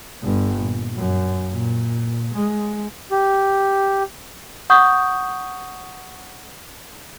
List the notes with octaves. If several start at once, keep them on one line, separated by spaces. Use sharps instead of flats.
G1 D3
A#2
F#2
A#2
G#3
G4
F#5 C#6 D#6 G6